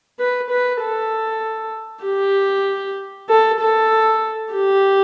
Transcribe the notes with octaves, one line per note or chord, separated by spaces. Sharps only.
B4
B4
A4
G4
A4
A4
G4